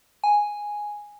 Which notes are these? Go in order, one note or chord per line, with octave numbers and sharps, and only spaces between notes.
G#5